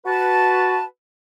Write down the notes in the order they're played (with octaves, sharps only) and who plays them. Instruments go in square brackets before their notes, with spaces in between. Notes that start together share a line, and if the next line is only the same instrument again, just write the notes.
[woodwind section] F#4 B4 A5